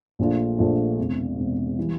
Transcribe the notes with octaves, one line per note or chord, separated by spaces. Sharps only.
A#1 A#2 A3 D4 F4
A#1 A#2 A3 D4 F4
E1 E2 C3
E1 E2 C3
E3 G3